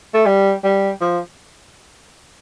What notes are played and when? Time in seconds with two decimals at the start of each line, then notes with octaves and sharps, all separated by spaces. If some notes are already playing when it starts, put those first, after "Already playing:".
0.14 A3
0.26 G3
0.64 G3
1.01 F3